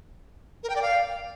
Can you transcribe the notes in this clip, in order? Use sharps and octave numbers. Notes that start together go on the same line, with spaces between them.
A#4
G5
D5
F5